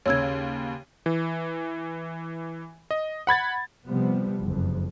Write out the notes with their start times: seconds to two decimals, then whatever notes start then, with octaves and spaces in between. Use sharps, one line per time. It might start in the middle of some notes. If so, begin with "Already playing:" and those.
0.06 D#2 C#3 C#5 E6 G#6
1.06 E3
2.91 D#5
3.27 F#5 B5 G#6 A6
3.85 C3 F3 G3 B3
4.43 F#1 F2